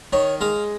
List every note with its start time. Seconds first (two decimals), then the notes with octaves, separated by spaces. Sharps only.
0.13 D#3 C#5
0.41 G#3 F5